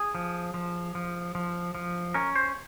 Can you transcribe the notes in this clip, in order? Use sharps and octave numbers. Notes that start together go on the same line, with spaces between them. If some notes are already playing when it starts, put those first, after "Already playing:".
Already playing: G#4
F3
F3
F3
F3
F3
C#4 A#4
C5